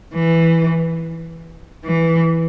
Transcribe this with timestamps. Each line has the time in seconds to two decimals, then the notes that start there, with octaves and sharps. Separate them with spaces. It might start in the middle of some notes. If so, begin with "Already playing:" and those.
0.14 E3
1.85 E3